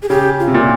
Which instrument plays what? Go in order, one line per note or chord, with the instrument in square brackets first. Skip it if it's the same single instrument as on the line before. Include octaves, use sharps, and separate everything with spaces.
[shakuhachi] G#4
[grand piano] C#3 [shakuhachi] G4
[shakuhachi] F4
[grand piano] C3
A#2